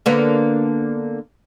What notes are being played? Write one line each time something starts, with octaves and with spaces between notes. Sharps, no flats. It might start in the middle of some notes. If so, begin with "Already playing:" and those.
D3 A#3 B3